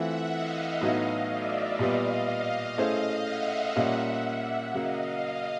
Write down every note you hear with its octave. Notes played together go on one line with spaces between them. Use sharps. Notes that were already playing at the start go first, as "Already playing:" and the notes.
Already playing: E3 A3 C4 F4 E5 F#5
D#5 F5
A2 F#3 B3 D#4 F#4
D5 E5
A#2 G3 B3 D#5 F5
A3 C#4 E4 G#4 C5 D#5 F5
E5 F#5
A#2 G3 A#3 C#4
E5 F#5
C#3 F#3 A#3 D#5 F5
D#5 F5